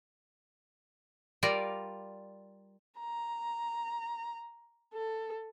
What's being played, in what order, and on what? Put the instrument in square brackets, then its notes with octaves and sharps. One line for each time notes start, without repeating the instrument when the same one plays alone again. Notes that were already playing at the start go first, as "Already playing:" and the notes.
[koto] G3 F4 A#4 D5 F5 A#5
[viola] A#5
A4